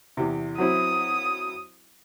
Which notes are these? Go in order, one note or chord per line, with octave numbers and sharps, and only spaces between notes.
E2 C3
F#3 C4 E4 D#6